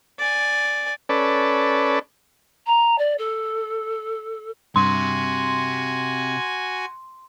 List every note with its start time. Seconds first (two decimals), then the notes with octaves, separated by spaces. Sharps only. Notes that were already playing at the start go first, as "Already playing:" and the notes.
0.18 D5 G#5
1.09 C#4 A4 B4 D5
2.66 A#5
2.98 D5
3.18 A4
4.76 G2 C3 F#4 G#5 C6